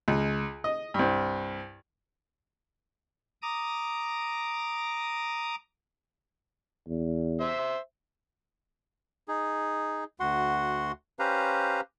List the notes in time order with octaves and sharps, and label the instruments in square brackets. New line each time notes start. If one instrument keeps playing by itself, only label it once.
[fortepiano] C#2
D#5
C2 G2
[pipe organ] A#5 D6 D#6
[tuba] E2
[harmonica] C5 E5
[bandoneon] D#4 G#4
D2 F#4 F#5 C6
C#4 G4 B4 C5 F5 A#5